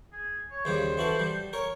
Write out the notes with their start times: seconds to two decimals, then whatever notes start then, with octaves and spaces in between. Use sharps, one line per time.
0.12 G#4
0.51 C#5
0.65 D#2 C#3 G3 C5
0.97 E3 F#4 A4
1.20 G3
1.53 A#4 C#5